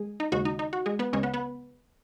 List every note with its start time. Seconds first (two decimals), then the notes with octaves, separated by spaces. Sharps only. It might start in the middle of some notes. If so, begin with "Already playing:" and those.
Already playing: G#3 G#4
0.20 D#4
0.32 D#2 C#3 G#3 F#4
0.45 D#4
0.59 D#4
0.73 F#4
0.86 G#3 G#4
0.99 B3 B4
1.13 C#2 C#3 G#3 C#4 C#5
1.23 B3 B4
1.34 B3 B4